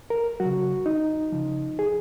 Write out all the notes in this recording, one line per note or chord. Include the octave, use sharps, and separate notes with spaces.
A#4
F#3 F#4
C#3
D#4
C#3 F3
G#4